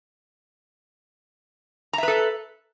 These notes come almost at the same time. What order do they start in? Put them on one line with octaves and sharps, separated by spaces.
A#5 E5 B4 A4